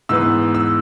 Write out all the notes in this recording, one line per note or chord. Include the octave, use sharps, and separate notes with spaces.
G#2 E3 B3 E6
E6